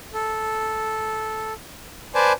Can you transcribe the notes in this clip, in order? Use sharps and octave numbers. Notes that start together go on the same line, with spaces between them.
A4
B4 C5 D5 G#5 A5